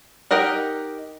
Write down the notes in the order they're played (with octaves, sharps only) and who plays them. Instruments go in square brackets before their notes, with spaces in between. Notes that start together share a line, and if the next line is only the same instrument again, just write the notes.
[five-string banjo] D#4 G4 A#4 D#5 F#5